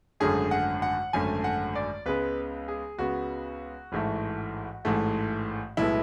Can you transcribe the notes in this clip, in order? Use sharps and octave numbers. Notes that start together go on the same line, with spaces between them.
G#1 F#2 D3 A3 G#4
F#5
F#5
G#1 F#2 D3 A3 G#5
F#5
D5
C#2 C#3 G#3 B3 B4
G#4
C#2 C#3 G#3 B3 F#4
A1 G#2 E3 A3
A1 G#2 E3 A3
B1 A2 G#3 B3 E4